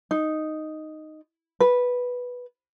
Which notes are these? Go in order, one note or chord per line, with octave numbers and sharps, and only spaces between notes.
D#4
B4